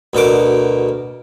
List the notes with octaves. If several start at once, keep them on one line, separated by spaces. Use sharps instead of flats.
D2 B2 A#4 D6